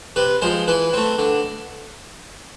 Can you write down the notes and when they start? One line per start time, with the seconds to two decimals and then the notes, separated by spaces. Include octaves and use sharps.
0.16 C3 B4
0.42 F3 G#3 C5
0.68 E3 B4
0.93 A3 C4
1.18 D3